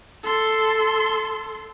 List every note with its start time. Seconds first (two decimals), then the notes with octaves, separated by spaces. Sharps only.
0.23 A4 C6